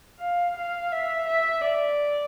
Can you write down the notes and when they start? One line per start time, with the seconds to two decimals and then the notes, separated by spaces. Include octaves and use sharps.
0.20 F5
0.56 F5
0.92 E5
1.27 E5
1.64 D5